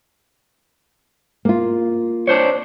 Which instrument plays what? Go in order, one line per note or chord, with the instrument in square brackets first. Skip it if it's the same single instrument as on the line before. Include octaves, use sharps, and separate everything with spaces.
[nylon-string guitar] A#3 F4
[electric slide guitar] D4 C5 C#5